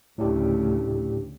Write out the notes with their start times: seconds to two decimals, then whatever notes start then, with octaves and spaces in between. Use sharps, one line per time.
0.18 D2 A2 C#3 A3 D4 G4